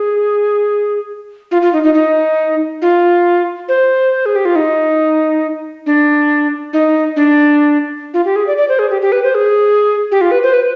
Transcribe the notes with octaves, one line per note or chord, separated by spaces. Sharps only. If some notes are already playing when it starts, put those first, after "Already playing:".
Already playing: G#4
F4
F4
D#4
D#4
D#4
F4
C5
G#4
G4
F4
D#4
D4
D#4
D4
F4
G4
G#4
D5
D5
C5
G#4
G4
G4
B4
C5
G#4
G4
F4
B4
C5
B4